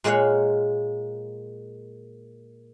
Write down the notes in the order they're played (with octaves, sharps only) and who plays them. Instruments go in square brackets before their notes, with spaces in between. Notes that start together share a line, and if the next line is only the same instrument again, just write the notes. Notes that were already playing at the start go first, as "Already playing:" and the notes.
[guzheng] A#2 G#3 A#3 C#5 F5 F#5